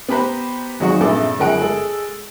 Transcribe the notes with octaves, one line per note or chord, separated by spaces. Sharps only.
B3 G4 B4 C5 A#5
G#1 F#3 G#3 D#4 F#4 C#6
A#1 G2 C3 G#4 A4 D6
G1 F#2 G#3 A#4 F#5 D7
G#3 G#4 A4